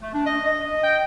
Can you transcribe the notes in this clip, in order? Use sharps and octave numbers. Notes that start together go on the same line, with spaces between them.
A3
D4
D#5
D#5
G5